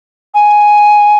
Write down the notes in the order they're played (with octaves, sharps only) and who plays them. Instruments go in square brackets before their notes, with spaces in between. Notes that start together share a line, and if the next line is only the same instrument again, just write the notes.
[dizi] G#5